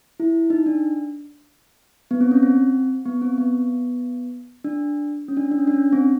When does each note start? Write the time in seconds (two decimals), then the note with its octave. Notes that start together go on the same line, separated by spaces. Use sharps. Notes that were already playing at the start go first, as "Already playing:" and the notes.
0.20 E4
0.50 D#4
0.66 D4
2.11 B3
2.21 C4
2.31 C#4
2.43 C4
3.05 B3
3.22 C4
3.38 B3
4.64 D4
5.28 C#4
5.37 D4
5.44 C#4
5.51 D4
5.59 C#4
5.67 D4
5.74 C#4
5.93 C4